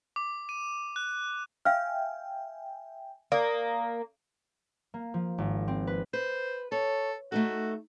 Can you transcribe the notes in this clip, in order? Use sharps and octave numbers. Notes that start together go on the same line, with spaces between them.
D6
D#7
F#6
E5 F5 G5 G#5 F6
A#3 D5 D#6
A#3
F3
G#1
C4
B4
B4 C5
A4 C#5
A3 D#4 F#4 A4